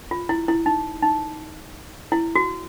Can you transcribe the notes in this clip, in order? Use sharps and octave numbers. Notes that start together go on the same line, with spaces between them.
F4
E4
E4
D#4
D#4
E4
F#4